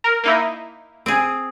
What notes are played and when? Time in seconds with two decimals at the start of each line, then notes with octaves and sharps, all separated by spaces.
0.04 A#4
0.24 A#3 D#4 E4
1.06 C4 G#4